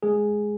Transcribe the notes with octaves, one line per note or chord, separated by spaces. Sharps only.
G#3 G#4